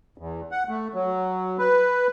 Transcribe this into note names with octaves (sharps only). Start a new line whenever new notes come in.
E2
F#5
A3
F#3
B4